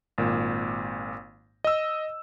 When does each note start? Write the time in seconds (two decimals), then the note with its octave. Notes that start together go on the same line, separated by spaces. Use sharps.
0.18 G#1 A#2
1.64 D#5 E6